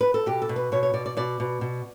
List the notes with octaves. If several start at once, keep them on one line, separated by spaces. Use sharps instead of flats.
B4
A4
B2 G4
A4
B2
B4
B2 C#5
C#5
B2 D5
D5
B2 D5
B2
B2